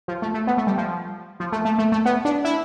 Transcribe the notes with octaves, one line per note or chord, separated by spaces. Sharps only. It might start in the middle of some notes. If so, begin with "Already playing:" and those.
F3
A3
A3
B3
A3
G3
F3
F3
A3
A3
A3
A3
B3
D4
E4